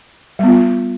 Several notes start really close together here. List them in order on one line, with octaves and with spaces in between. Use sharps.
G3 B3 F4